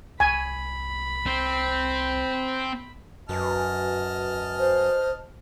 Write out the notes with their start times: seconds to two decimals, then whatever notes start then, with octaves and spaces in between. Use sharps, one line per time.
0.20 C2 G#5 B5
1.26 C4
3.29 F#2 F#4 B4 D#5 G#5 A5 F6
4.59 C5